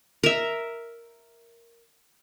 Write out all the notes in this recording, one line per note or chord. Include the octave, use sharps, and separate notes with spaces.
A#4 E5